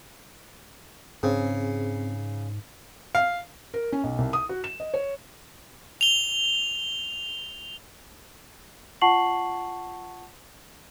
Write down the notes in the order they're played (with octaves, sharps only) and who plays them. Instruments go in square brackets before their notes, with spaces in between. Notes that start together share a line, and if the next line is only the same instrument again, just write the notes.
[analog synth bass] G#2 [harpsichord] C#3 [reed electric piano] C4 G#4
[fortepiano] F5
[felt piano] A#4
C#4
B1
C2
D#6
F#4
E7
D#5
C#5
[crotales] F7 G7
[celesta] F4 F#5 A5 C#6 C7 F#7